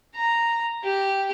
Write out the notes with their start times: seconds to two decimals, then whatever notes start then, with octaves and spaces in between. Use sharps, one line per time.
0.15 A#5
0.84 G4